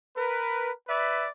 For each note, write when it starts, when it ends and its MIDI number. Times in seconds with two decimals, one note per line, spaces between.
0.17 0.71 70
0.17 0.71 71
0.89 1.26 71
0.89 1.26 74
0.89 1.26 76